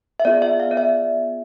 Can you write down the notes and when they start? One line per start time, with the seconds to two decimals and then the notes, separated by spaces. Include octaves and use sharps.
0.20 E5
0.25 B3 F4 G#4 D5
0.42 E5
0.60 F5
0.71 D5
0.77 E5